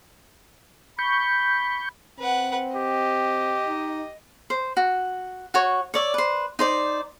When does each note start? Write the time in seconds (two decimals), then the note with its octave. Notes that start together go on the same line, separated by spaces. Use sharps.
0.99 B5 C#6 G6
2.19 C4 B4 F#5
2.75 G4 D#5
3.67 D#4
4.50 C5
4.77 F#4
5.54 F#4 C#5 C#6
5.94 C#5 D5 E5
6.14 B4 C5
6.59 D#4 C5 D5